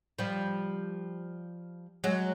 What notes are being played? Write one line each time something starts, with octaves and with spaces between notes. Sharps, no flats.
F3 G3
F#3 G#3